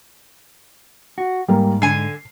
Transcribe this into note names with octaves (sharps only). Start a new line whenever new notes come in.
F#4
G#2 G3 A#3
D3 G#5 C7